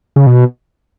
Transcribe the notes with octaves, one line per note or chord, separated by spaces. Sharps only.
C#3
B2